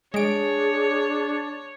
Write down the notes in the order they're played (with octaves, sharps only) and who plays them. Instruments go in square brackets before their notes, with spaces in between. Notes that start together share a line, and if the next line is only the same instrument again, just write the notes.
[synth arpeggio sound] G#3 D7 [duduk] D4 [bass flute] G#4 [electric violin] C#5